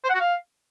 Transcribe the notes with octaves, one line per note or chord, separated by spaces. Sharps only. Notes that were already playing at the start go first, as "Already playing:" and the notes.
C5
F#5
F#4
F5